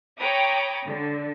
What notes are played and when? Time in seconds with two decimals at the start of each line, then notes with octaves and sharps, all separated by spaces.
0.18 C#5 G5 A#5 B5 D6 D#6
0.86 D3